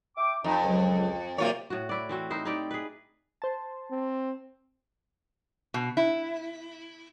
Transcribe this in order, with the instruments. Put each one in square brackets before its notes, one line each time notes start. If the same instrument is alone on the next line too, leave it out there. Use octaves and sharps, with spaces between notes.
[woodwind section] E5 G5 D6
[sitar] F2 [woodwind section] D#4
[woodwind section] C#2 F#3
[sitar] C3 F4 C#5 [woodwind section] F#3 A#3 D5
[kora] A2 F#4
E4 D5
E3 C4 F#4
D#4 E4 C5
D#4 E4 G4 D5
G#4 B4
[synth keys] C5 A5
[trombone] C4
[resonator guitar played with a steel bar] B2
E4